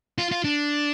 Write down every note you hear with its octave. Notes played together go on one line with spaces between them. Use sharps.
F4
F4
D4